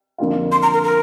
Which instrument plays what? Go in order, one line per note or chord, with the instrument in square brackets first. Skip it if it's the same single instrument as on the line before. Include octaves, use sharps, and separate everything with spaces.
[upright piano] F2 D3 A#3 F4
[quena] C6
A#5
A#4
A#4